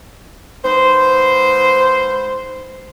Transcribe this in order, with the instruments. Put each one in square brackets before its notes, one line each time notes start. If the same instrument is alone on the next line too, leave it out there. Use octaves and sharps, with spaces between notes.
[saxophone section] G#2 B4 C5